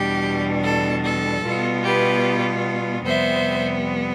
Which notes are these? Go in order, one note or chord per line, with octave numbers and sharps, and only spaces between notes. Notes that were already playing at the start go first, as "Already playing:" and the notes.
Already playing: E2 B2 G3 D4 G4
A4
A4
B2 G3 B3 F4
G4 B4
F2 C3 G3 B3 C5 E5